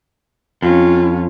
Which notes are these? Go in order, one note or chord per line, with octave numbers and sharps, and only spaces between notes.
F2 C#4 F4